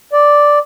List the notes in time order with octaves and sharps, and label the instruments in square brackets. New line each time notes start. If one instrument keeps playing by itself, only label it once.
[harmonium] D5